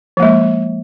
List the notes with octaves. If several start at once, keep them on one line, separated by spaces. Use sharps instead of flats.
F3 G#3 A#3